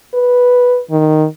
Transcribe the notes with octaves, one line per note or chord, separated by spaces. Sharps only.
B4
D#3